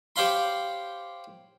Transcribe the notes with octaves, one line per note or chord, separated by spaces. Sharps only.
G4 C5 C#5 F5 B5 C6